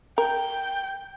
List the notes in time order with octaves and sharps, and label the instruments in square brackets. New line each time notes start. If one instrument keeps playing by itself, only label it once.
[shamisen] A#4 [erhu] G5